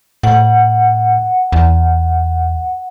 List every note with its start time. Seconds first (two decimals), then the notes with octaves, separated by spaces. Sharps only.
0.23 A2 F#5
1.52 E2